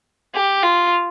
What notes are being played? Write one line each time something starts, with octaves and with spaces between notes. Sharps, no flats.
G4
F4